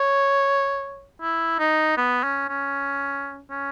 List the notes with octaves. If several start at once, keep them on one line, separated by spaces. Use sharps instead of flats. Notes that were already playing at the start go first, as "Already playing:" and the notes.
Already playing: C#5
E4
D#4
B3
C#4
C#4
C#4